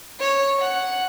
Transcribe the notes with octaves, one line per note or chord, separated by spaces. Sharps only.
C#5
F#5